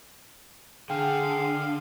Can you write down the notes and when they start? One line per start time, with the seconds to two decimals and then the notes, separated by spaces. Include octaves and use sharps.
0.90 D3 G#4 F5 G5